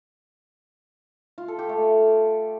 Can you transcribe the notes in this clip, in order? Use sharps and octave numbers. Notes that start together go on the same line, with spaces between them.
F4
A4
G4
A3